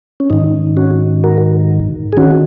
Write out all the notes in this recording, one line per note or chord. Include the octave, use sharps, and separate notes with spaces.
C#4
G#2 D#3 D#4
C#4 F#4
F#4 A#4
G#4
D#3 C#4 F#4